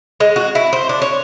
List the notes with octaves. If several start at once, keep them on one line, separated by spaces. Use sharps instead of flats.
G#3
F#4
E4
C5
D4
C#5